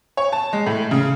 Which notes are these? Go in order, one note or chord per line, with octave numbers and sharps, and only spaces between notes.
C#5
A5
G#3
A2
C#3